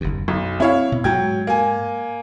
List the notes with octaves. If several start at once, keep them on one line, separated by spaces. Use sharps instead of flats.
F#1 D#2
B1 F#2
C4 E4 C#5 F5
B2
G#2 F#3 G#3 G5 G#6
A#3 G#5